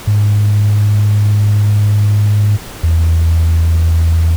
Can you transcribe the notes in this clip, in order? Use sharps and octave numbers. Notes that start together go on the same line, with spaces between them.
G#2
E2